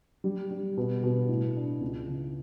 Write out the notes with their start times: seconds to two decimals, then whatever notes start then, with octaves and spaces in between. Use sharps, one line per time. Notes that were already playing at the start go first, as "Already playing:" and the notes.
0.24 G3
0.51 G3
0.77 B2
1.03 B2
1.29 A2
1.56 D4
1.81 C#2
2.08 C#3